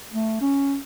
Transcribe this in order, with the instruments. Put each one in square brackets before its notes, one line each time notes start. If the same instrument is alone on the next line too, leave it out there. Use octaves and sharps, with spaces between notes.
[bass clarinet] A3
C#4